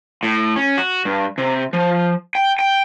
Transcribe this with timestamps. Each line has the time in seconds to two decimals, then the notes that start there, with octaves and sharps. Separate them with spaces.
0.23 A2
0.56 C#4
0.78 F#4
1.05 G2
1.38 C3
1.73 F3
2.35 G5
2.59 G5